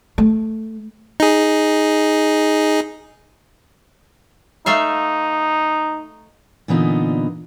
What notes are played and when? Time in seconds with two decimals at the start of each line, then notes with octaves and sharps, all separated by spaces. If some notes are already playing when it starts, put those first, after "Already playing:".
0.18 A3
1.20 D#4 G#4
4.66 A3 D#4 E5 F5
6.68 A#2 D3 E3 B3 D#4 F4